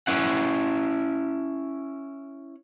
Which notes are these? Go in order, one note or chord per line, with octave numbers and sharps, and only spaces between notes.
C#4 E4 F#5